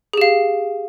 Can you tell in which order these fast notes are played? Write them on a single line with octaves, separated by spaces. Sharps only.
G#4 G4 F5